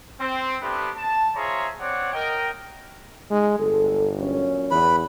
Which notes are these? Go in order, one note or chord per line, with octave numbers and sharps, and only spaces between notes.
C4
A3 B3 C4 D4 G4 B4
A5
F4 G#4 C5 C#5 E5 A#5
C4 C#5 D5 F#5
A#4 D#5 G5
G#3 D#4
G1 A4
A#2 F#3 C#4
E2 B4 B5